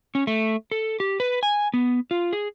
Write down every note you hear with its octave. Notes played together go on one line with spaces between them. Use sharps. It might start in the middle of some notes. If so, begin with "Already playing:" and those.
C#4
A3
A4
G4
B4
G#5
B3
F4
G#4